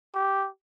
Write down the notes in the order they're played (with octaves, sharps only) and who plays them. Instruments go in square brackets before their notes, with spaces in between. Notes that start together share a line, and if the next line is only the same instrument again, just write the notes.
[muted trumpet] G4